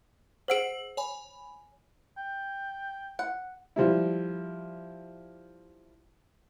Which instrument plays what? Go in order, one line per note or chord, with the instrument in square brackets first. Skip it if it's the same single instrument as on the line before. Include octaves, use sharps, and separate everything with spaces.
[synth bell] G#4 E6 F#7 [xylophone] C5 F#5 D7
[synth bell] C#5 G#5 B5
[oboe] G5
[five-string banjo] F#5
[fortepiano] F3 G3 E4